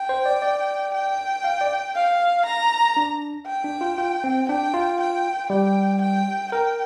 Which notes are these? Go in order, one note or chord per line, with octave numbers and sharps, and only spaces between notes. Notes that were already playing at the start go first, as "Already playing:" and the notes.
Already playing: G5
C5
D5
D5
G5
F5
D5
F5
A#5
D4
G5
D4
F4
F4
C4
D4 G5
F4
G5
G3 G5
G5
A#4 G5